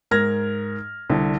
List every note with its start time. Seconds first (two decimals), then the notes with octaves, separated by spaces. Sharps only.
0.11 G#2 A#4 F6 G#6 A#6
1.10 C2 D3